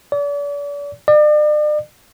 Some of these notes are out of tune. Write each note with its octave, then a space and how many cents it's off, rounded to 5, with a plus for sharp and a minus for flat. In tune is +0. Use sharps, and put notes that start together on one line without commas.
D5 -40
D5 +40